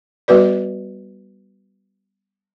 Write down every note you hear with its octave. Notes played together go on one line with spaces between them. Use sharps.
G3 B3 F#4 B4 D5